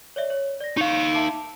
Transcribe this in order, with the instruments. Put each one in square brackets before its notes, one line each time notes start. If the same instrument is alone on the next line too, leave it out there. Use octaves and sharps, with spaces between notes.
[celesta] C#5 D5 E5
C#5
D5 A#6
[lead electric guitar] D#4 F5 [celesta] C#6
[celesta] E5 A5 D6